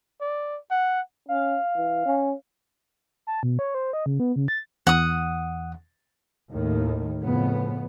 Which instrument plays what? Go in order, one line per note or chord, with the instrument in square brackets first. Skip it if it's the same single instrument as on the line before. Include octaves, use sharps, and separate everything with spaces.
[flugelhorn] D5
F#5
[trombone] C#4 [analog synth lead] F5
[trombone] E3
C#4
[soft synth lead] A5
B2
C#5
C5
D#5
C#3
B3
C#3
A6
[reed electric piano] E2 [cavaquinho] F#5 D#6
[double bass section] D#2 A2 D#3
F2 A2 C#3 B3